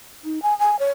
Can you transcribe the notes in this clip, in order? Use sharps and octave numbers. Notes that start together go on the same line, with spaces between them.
D#4
G#5
G#5
C#5